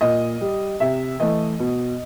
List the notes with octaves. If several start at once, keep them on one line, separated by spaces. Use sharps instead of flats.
A#2 D#5
G3
C3 E5
E3 A3 D#5
B2